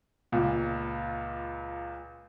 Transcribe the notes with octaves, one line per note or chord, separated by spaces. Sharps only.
C#2 A#2